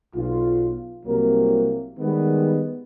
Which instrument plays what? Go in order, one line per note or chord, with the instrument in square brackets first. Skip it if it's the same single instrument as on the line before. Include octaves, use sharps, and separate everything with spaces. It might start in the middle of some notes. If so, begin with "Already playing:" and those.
[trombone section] B1 F4
C2 C3 F#3 A#3 A#4
D#3 G3 G#3 B3